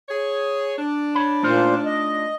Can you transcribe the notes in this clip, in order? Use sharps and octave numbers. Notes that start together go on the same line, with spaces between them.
G#4 C#5
D4
C#5 B5
A#2 A3 D#4 F4 C5
D#5